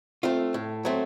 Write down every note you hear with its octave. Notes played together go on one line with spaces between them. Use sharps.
A3 C4 F4
A2
F#3 A3 C4